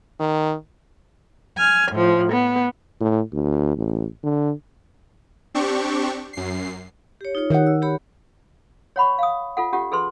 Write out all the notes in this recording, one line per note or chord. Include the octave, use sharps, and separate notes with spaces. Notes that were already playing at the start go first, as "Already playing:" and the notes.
D#3
G#5 F6
A2 F3
B3
A2
D2
A1
D3
C4 D4 G4 C#6
F#2 C7
G4 C#5
D#4 F4 C#5
D#3 D#4 G4 C#5 F#5
E6
G4 C#5 B5
C#5 F#5 B5 C#6
F5 D#6
F4 A4 F#5
C#4 F4 G4 F#5
G#4 A4 B4 C6